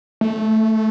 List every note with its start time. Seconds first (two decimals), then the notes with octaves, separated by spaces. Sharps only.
0.21 A3